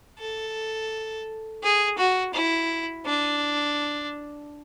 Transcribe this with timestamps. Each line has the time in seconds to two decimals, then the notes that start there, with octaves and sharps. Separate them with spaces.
0.19 A4
1.63 G#4
1.98 F#4
2.34 E4
3.06 D4